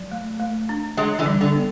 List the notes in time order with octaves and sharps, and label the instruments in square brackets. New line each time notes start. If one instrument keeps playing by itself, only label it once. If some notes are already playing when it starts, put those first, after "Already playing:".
Already playing: [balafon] F#3
A3
A3
D4
[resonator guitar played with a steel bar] F#3 G#3 [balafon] D4
[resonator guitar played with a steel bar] D3 E3
[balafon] G3
[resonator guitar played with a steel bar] D3
[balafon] B3